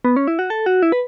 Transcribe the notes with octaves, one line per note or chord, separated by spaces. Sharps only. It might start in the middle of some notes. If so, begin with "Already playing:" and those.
B3
C#4
E4
F#4
A4
F#4
E4
B4